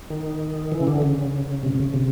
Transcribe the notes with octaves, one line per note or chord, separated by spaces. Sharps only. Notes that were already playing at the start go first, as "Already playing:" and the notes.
D#3
E3
C#3
D3
C#3
C3
C3
C#3
C3